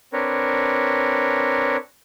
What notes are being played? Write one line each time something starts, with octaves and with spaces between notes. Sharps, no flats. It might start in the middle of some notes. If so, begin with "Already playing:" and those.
C4 D4 A#4 B4 C#5